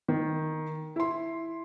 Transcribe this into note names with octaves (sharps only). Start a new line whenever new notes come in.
D#3
E4 C6